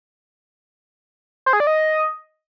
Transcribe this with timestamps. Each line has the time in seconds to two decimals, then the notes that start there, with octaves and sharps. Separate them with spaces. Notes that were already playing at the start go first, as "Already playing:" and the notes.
1.46 C5
1.53 G#4
1.60 D5
1.67 D#5